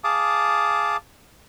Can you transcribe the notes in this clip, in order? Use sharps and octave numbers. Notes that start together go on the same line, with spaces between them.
G#4 F5 A5 D6 D#6